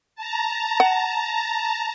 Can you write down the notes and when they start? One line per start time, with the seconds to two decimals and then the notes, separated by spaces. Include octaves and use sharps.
0.16 A5 A#5
0.80 F#5